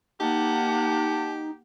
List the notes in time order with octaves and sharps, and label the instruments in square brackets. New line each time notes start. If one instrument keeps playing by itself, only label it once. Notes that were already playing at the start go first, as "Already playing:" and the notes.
[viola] A#3 F#5 [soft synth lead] D#4 [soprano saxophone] G4 [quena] A5